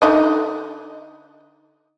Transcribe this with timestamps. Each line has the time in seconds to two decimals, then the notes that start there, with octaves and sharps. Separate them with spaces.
0.02 D3 D#4 D#5